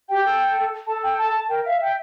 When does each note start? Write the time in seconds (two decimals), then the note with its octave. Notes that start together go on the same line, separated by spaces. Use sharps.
0.09 G4 G5
0.25 A4
0.87 A4 A5
1.03 G5
1.18 A5
1.49 A#4 G5
1.65 E5 F5
1.81 G5